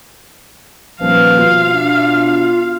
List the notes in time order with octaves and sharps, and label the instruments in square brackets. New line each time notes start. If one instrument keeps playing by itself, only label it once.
[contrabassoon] D#1 [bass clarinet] F3 [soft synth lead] B4 [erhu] F5
[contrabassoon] B2 [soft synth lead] F4
[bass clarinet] D4